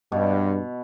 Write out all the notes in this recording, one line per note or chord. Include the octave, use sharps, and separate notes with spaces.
G2 B2